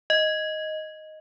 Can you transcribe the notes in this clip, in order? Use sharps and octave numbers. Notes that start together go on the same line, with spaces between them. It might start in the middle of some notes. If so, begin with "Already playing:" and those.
D#5